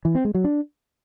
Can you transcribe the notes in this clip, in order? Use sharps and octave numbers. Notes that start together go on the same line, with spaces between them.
E3
C4
G#3
F#3
D4